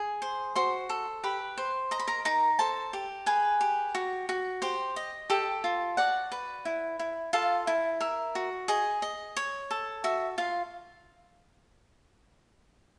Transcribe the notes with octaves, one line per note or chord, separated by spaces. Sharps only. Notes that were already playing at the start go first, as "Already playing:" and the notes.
Already playing: G#4
C5
F#4 C5 C6
A4
G4 B4 B5
C5
D#5 A#5
B5
A#4 A#5
D#4 A#4 A#5
A4 C5 A5
G4
G#4 B4 G#5
G4
F#4
F#4
G4 C5 G5
D#5
G4 A4 G5
F4
F#4 D5 F#5
B4
E4
E4
F4 A4 F5
E4
A#4 E5
F#4
G#4 D#5
D#5
C#5
A4
F#4 E5
F4 F5